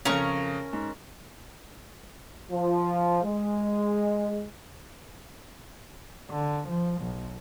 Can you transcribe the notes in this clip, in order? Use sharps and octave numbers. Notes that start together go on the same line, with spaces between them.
F2 C#3 C#4 A#4 C#6
G#2
F3
G#3
D3
F3
B1